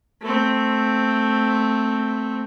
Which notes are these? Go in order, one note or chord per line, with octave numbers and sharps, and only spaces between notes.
A3 C4